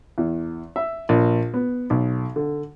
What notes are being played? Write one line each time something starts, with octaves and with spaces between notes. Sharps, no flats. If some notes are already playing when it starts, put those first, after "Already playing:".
E2
E5
A#1
B3
B1
D3